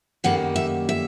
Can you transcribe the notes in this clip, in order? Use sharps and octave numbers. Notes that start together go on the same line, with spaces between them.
F#2 D#3 G3 A#3 F#5
E5
E5